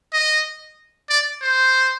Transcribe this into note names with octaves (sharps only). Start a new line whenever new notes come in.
D#5
D5
C5